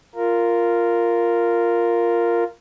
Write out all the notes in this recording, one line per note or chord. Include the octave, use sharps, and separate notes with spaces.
F4 A#4